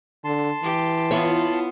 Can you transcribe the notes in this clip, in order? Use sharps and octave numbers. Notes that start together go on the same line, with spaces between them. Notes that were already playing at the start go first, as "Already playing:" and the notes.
D3 A5 C6
E3 G4
B3 E4 F4 C#5